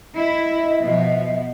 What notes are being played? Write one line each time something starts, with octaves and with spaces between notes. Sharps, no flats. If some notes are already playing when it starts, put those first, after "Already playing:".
E4 D#5 E5
B2 F3